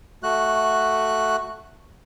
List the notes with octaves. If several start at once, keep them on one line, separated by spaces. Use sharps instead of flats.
A3 F#4 F#6